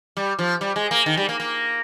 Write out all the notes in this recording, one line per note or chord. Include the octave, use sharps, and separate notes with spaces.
G3
F3
G3
G#3
A#3
D#3
G3
A#3
A#3